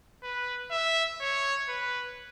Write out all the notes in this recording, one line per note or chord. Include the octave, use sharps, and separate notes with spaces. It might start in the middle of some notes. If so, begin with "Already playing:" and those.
B4
E5
C#5
B4